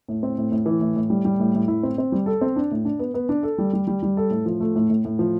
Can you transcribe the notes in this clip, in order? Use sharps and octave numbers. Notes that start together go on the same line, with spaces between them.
A2
C4
A2
A2
E3
A2
A2
G3
G3
A2
A2
E4
C4
C4
G3
A4
C4
D4
A2
D4
B3
B3
D4
A4
G3
G3
G3
G3
A4
A2
F3
A3
A2
A2
A2
F3